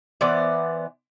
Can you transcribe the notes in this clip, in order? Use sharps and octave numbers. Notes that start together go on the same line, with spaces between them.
E3 B3 C5 D5